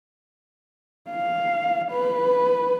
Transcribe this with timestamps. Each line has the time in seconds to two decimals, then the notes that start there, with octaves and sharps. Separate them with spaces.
1.10 F5
1.91 B4